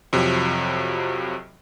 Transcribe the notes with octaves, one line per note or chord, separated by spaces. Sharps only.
F2 C3 F3 F#3